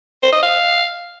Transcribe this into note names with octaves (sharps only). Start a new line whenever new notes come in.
C5
D#5
F5